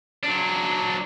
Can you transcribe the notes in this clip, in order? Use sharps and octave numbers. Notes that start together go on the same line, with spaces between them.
F#3 D4